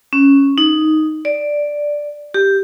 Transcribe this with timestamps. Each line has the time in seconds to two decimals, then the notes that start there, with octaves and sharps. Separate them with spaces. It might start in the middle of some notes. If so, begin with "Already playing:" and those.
0.13 C#4
0.58 D#4
1.25 D5
2.34 G4